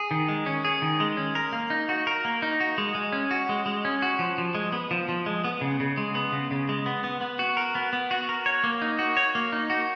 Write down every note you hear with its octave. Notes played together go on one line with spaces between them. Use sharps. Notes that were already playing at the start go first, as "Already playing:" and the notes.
Already playing: G#4
D#3
G#3
C#4
G#4
D#3
G#3
C#4
A#4
A#3
D#4
F#4
A#4
A#3
D#4
F#4
G#3
G#3
C#4
F#4
G#3
G#3
C#4
F#4
F3
F3
G#3
B3
F3
F3
G#3
B3
C#3
C#3
G#3
B3
C#3
C#3
G#3
B3
B3
B3
F#4
A#4
B3
B3
F#4
A#4
C#5
A#3
D#4
F#4
C#5
A#3
D#4
F#4